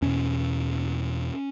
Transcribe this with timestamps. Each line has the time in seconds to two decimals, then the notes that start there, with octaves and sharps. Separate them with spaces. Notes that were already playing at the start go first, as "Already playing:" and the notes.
0.02 E2 B2 C#4